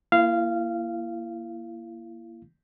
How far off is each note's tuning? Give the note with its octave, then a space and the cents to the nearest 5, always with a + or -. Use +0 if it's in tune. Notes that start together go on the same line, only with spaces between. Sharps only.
A#3 +5 E4 +30 F5 -15